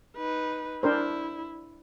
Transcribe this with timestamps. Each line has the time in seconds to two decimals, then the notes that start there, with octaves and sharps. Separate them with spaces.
0.17 D#4 B4
0.83 D4 E4 A#4 C5